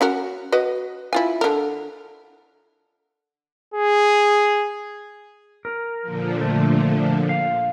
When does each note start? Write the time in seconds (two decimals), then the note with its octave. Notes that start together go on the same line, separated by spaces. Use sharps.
0.01 C#4 F#4 A#4
0.52 F#4 B4 D#5
1.13 E4 F4 G#5
1.41 D3 A#4
3.74 G#4
5.65 A#4
6.02 A#2 D3 F3
6.41 A3
7.29 F5